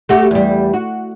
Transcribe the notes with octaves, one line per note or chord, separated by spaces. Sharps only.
A3 F#4 G4
E2 G3
F#4